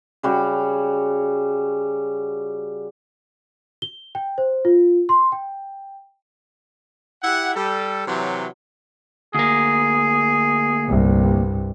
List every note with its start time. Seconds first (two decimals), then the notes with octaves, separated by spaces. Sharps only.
0.23 C#3 G3 F#4 C#5
3.82 G7
4.15 G5
4.38 C5
4.65 F4
5.09 C6
5.32 G5
7.23 E4 G4 E5 F#5
7.55 G3 A4
8.07 C3 E3 F#3
9.35 D2 A#3 G#4
10.89 C2 G2